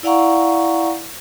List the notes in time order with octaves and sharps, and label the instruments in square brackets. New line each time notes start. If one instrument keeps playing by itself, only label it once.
[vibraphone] E4 D5 F5 F#5 A#5 C#6